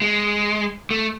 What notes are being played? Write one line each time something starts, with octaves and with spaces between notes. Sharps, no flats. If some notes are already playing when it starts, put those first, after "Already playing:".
G#3
A3